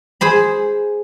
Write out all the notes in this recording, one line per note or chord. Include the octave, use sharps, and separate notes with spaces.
G#4 C5 B5